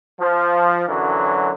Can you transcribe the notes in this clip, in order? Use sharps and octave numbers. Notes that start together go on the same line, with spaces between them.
F3
F#2 D3 E3 F#3